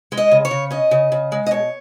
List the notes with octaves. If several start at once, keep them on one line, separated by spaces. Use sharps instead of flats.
G#3
D#5
C#3
C#5
C#3
C#4 D#5
C#3
C#3
G#3
D#5
B2 C#5